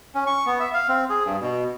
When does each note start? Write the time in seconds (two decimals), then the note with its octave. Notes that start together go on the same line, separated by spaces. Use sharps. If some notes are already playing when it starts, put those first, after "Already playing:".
0.15 C#4
0.27 C#6
0.46 B3
0.60 E5
0.74 F5
0.88 C4
1.10 G#4
1.25 G2
1.41 B2